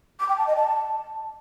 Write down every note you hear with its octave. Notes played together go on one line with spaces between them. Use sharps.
D6
G5
A5
D#5
A5